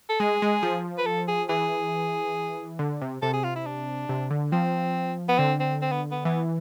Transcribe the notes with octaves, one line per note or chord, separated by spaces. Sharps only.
A4
G#3 G#4
G#3
F3
B4
A4
G#4
E3 G#4
D3
C3
C3 A4
G#4
F4
E4
D4
C3
D3
F3 C4
B3
D3 C4
C4
C4
B3
B3
E3 B3